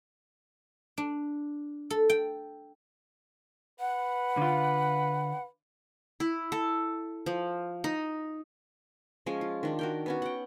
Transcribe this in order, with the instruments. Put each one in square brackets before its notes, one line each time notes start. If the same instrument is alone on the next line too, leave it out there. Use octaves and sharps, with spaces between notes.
[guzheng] D4
A4
G5
[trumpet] B4 [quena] F#5
[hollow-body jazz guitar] D3 F4
[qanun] E4
A4
F3
D#4
F3 G#3 C#4
F4
D#3 D4 D#4
F#4 A#4 G5
B3 C#4 F#4
F#5 G5